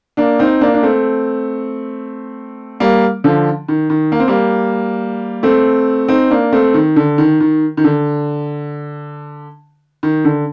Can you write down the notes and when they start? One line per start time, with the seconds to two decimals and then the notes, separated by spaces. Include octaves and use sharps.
0.17 A#3 D4
0.39 C4 D#4
0.61 A#3 D4
0.74 D4
0.83 A3 C4
2.80 G3 A#3
3.24 D3 F3
3.68 D#3
3.90 D#3
4.12 A#3
4.20 C4
4.28 G3 A#3
5.43 A3 C4
6.08 C4 D#4
6.31 A#3 D4
6.52 A3 C4
6.74 D#3
6.96 D3
7.18 D#3
7.40 D#3
7.77 D#3
7.84 D3
10.03 D#3
10.25 D3